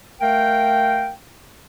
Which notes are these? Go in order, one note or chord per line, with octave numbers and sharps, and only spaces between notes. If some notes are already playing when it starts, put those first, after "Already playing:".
A3 A#4 F5 G5